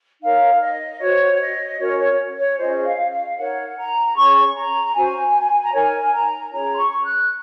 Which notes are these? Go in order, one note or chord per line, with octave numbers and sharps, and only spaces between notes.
D#4 A#4 C#5 F5
D#5
F#4 C5 C#5
D#5
C#4 F#4 A#4 C#5
C#5
C#5
C#4 F4 G#4 C5 D#5
D#5
F5
F5
D#4 A#4 C#5 F#5
A#5
C#4 G#4 C#5 C#6
A#5
C#4 F#4 C5 G#5
A#5
D#4 A#4 C#5 G#5
A#5
C#4 F4 G#4 C#5 A#5
C6
C#6
F#6